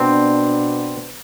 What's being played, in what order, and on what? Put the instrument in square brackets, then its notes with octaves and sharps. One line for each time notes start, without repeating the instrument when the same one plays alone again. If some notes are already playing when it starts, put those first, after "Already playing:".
Already playing: [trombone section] B2 B3 D4 [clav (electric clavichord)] C4